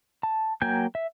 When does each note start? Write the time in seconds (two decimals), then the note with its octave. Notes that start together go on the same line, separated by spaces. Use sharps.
0.23 A5
0.62 F#3 A#3 G5 G#5 G6
0.95 E5